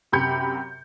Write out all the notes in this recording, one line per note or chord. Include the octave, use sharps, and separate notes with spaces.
F#2 C3 G4 B5 G6 C#7